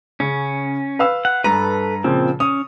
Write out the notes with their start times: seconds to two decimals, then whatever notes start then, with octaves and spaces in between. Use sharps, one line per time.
0.20 C#3 C#4
0.99 B4 F5 E6
1.25 F#5
1.44 G2 A4 B4 A#5
2.04 A#2 C#3 F3 C4
2.40 C#4 D#6